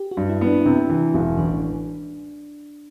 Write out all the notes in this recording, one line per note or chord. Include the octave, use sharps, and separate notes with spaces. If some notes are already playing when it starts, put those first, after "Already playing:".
Already playing: G4
F#4
G2
E4
B3
D4
E4
C3 D4
E3
E1
A1 D4